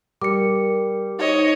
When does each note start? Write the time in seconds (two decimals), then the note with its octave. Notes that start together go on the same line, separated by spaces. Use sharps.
0.22 G3 A#4 D6 C#7
1.19 D#4 C5 C#5 D#5